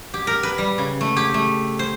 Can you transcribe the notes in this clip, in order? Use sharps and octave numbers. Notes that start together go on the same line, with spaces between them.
G4
A#4
B4
G3
C#3
A3
G4
A3
C5